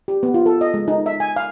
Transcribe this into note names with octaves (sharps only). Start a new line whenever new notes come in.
G4
B3
F4
A4
D#5
G#3
D#4
E5
G#5
F5